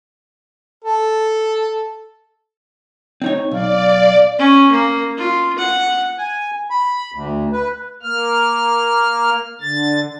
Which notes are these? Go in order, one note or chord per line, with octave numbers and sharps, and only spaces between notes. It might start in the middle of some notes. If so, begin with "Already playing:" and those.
A4
C4 D#4 C#5
B1 D5 F5
C#4
A#3
F4
F#5
G#5
B5
D2
B4
A#3 F6
D3 A6